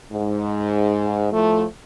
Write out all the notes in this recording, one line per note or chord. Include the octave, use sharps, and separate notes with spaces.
G#2
A2 F3 A3